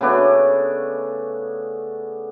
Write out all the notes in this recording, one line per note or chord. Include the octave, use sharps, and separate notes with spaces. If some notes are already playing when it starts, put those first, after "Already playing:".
C#3 A3 B3 D4